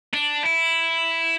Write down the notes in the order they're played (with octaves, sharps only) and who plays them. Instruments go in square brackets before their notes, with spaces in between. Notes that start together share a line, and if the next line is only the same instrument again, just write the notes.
[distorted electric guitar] D4
E4